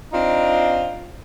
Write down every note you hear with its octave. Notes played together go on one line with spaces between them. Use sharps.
C4 D4 D#4 F4